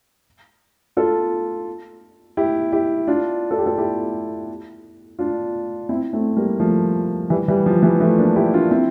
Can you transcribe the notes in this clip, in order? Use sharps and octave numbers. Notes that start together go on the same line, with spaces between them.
F4 A4
E4 G4
E4 G4
D4 F4
A4
G4
F4 A4
E4 G4
D4 F4
C4 E4
A3 C4
G3 A#3
F3 A3
E3 G3
E3 G3
F3
E3 G3
F3 A3
A#3 D4
E4 G4
D4 F4
C4 E4